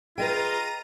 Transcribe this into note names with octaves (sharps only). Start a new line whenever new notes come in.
F4 G#4 B4 D#5 G5 A#5 D#7